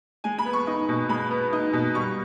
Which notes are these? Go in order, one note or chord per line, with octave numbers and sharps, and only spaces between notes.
G#3 G#5
B5
B3
C#6
D#4
B2
G#3 B5
B3
D#4
B2
G3 C#6